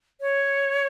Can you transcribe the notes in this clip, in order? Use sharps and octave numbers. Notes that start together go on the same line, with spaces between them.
C#5